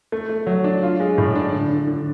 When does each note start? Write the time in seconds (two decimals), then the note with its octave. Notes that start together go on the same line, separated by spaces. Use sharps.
0.12 A3
0.30 A3
0.47 F#3
0.64 D4
0.83 F4
1.00 G#3
1.18 A2
1.35 D4
1.52 D3
1.70 D3
1.87 D3